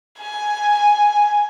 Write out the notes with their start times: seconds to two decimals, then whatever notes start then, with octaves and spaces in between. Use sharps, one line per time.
0.19 G#5